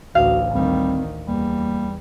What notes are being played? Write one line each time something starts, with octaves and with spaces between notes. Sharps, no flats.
A1 D2 F#4 F5
D2 D#3 G3 C4
E2 G3 A#3